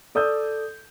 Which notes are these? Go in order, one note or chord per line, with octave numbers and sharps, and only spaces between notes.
A4 D5 D#6 E6 G6